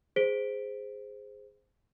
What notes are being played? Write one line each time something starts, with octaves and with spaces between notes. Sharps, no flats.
G#4 C5 B6 D7 G7